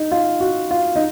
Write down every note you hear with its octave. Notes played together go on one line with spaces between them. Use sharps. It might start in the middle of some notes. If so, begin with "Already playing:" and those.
Already playing: D#4
F4
F#4
F4
D#4